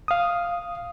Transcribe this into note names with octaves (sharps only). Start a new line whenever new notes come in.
F5 D#6